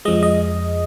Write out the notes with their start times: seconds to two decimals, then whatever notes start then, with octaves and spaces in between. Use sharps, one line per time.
0.05 F2 F3 G#3 D#5
0.23 D#5